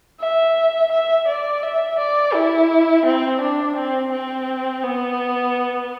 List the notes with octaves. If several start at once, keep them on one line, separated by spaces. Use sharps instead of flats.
E5
E5
D5
E5
D5
E4
C4
D4
C4
C4
B3